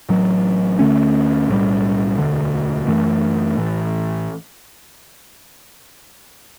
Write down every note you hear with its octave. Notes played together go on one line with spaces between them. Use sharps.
A1 A2 F#3
D2 D3 A3 C#4
B1 A2 G3
E1 D2 D3
F#2 E3 A3
A1 A2 E3